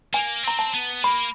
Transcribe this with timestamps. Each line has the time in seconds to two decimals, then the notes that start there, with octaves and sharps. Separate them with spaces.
0.14 A#3 G#5
0.43 C4 A#5
0.59 A5
0.74 B3
1.04 A#3 B5